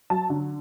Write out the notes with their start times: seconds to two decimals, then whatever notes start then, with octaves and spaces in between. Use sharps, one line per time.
0.10 F#3 A5
0.30 D3